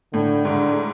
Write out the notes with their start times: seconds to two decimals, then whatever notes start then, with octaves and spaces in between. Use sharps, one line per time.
0.13 A2 D3
0.45 G#2 D3